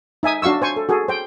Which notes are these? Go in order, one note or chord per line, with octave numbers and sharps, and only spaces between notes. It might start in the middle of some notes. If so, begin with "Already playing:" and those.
D#4 E5 G#5 D#6
D4 F#4 F5 C#6 E6
C5 G#5 C#6
A4
F#4 G#4 A4
C5 G5